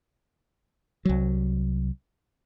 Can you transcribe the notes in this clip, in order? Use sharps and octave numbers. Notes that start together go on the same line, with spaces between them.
C2 F#3